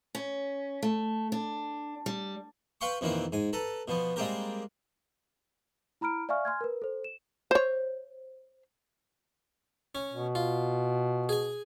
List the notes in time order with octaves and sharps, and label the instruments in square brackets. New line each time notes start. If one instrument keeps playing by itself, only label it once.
[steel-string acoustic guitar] C#4
A3
D4
G3
[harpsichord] B4 F5 G5 C6 C#6
F2 B2 D#3 E3 A#3 C4
G#2 G#5
A4 B4 A#5
B2 F3 B3
G3 G#3 A#3 C4 G4 A#4
[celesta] E4 A#5 B5 F6 D7
D5 E5 F5 G#5 C#6 F6
G#5 C6 F6 G#6
A#4 B4
A4 C5
E7
[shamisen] C5 C#5
[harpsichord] C#4
[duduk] B2
[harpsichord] F4
G#4 G#5